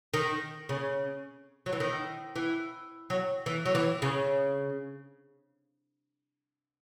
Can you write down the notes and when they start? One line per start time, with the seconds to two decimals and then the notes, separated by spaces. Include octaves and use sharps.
0.14 D#3
0.69 C#3
1.66 F#3
1.73 E3
1.80 D#3
2.36 E3
3.10 F#3
3.46 E3
3.66 F#3
3.75 E3
4.02 C#3